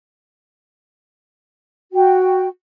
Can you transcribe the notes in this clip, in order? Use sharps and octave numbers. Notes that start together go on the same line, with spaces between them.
F#4 G5